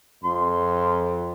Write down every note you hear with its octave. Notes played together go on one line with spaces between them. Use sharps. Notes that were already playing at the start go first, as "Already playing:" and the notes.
F2 C6